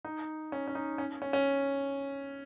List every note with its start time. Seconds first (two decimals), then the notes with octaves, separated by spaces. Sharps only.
0.05 D#4
0.52 C#4
0.68 C#4
0.75 D#4
0.98 C#4
1.22 C#4
1.33 C#4